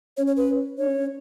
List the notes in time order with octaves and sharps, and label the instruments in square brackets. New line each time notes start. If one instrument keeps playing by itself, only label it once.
[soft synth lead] C#4 [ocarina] C#5
[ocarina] C#5
B4
[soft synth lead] D4 [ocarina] C#5
[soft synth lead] C#4
C#4